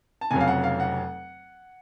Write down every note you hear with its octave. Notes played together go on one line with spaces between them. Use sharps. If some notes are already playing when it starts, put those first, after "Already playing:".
A5
F1 F2 C#3 F#3 G#5
F5
F#5
F5
F#5